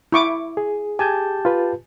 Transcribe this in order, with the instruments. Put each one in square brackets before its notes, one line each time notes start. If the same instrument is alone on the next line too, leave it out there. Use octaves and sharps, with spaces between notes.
[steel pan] E4 C#6 D6
[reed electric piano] G#4
[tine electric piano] G4 A5 G6 [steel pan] G#5
[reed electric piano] F4 B4